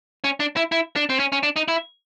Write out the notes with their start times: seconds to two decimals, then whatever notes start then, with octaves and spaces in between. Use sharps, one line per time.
0.24 C#4
0.40 D4
0.57 E4
0.72 E4
0.96 D4
1.10 C4
1.20 C#4
1.32 C#4
1.43 D4
1.56 D#4
1.68 E4